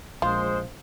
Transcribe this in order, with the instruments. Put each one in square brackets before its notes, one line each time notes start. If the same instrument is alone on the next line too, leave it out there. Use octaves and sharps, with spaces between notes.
[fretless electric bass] A#1 [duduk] G#3 [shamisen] F4 [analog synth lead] C5